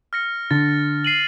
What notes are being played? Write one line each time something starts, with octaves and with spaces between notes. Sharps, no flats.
F6 A#6 C#7
D3 A6
C7 D#7 F#7